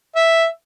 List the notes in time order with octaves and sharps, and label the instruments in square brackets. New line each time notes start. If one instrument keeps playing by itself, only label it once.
[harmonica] E5